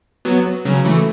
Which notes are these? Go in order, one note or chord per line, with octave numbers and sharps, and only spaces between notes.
F#3 B3
C#3 F#3
E3 A3